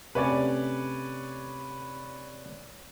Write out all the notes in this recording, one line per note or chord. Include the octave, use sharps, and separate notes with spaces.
C3 A3 C#4 B4 C#5 D5